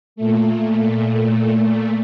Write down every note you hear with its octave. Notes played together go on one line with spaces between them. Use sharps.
A#2 A3